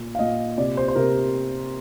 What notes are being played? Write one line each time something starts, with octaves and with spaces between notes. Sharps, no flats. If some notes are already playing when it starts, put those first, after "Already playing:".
Already playing: A#2
F5
A#2 D#5
C3 D5
C5
C5
C3 A#4